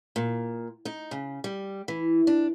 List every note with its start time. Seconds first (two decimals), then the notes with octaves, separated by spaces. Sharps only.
0.16 A#2
0.85 D#4
1.11 C#3
1.44 G3
1.88 E3
2.27 D4